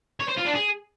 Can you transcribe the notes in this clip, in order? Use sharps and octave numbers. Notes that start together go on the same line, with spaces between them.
C#5
C5
F4
D4
G#4